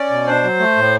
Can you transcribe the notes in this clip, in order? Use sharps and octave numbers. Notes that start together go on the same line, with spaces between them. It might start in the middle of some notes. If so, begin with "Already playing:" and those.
Already playing: C#4 D5
B2
D4 C5
F#3
A3
A2